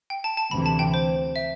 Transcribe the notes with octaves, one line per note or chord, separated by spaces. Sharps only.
G5
A5
A5
D2 C3 E3 B5
A5
G5
C5
E5